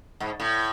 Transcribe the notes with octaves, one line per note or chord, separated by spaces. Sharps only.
G#2
A2